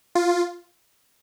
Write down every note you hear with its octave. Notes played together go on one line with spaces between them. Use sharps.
F4